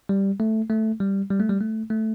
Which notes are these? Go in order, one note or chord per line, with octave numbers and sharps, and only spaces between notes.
G3
A3
A3
G3
G3
A3
G3
A3
A3